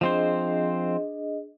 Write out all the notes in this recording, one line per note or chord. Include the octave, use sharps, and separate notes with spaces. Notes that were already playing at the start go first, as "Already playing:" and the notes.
F3 C4 D4 G#4 C5 D#5